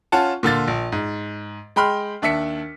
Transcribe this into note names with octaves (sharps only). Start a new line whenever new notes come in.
C#4 F4 F#5 A5
A#2 D3 F4 A6
A#1
G#2
G#3 G5 B5 C6 F6
D#2 D4 E5 B6 C#7